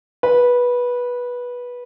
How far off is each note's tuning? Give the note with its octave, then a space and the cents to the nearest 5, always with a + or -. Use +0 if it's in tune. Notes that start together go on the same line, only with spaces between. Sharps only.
B4 -15